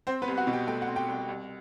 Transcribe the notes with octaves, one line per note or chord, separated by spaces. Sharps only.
C4 C5
B3 B4
C2
F#4 F#5
B2
G4 G5
A3 G5
F#5
C4
G4 G5
C2
C2